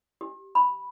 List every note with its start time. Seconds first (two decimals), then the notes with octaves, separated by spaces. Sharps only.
0.21 G4
0.55 B5